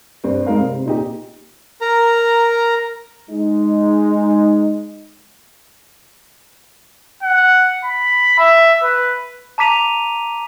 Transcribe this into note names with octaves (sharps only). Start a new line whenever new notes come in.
G2 C4
G#3 D#4 A#4 F5
C3
A#2 D#4 G4
A#4 A#5
G#3 D#4
F#5
B5
E5
B4
A5 A#5 D6 B6 D#7 F7